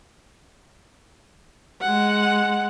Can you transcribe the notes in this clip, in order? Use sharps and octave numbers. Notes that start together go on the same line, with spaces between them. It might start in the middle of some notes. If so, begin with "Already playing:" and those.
G#3 F#5